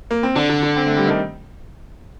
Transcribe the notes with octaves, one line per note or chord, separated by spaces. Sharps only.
A#3
C4
D3 D4
D4
D4
C4
A3
G3
D#3